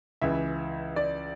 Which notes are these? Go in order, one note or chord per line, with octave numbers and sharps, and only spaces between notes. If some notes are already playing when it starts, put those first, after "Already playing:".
C#2 C#3 E3 E5
D5